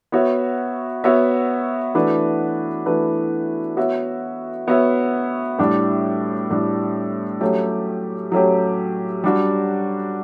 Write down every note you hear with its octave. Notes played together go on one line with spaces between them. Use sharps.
B3 F#4 C#5 E5
B3 F#4 C#5 E5
E3 A3 D4 F#4 B4
E3 A3 D4 F#4 B4
B3 F#4 C#5 E5
B3 F#4 C#5 E5
A2 G3 D4
A2 G3 D4
F#3 A3 C#4 G4
F#3 A3 C#4 G4
G3 D4 F#4